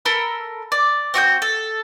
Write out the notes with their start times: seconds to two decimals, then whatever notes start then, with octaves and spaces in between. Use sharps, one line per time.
0.05 A4 A#4 B5 E6
0.72 D5
1.14 C4 F#4 D6 G6
1.42 A4